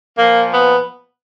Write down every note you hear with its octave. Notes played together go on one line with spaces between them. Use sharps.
A#2 F3 A#3
B3